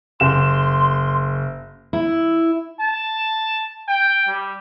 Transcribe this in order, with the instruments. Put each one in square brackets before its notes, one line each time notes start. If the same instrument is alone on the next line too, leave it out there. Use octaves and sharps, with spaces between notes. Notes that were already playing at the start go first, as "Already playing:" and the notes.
[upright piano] F#1 E7 [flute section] C6
[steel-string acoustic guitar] E4
[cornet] A5
G5
G3